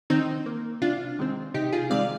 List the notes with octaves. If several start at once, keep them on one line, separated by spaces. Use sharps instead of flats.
D#3 C4 D#4
A#3
C3 D4 F4
D#3 G#3 C4
C3 D#4 G4
F4 G#4
D#3 G#3 C4 D5 F5